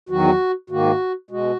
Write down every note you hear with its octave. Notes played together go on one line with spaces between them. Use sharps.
E2 D#3 F#3 F#4
G#2 D#3 A#3 F#4
B2 G#3 F#4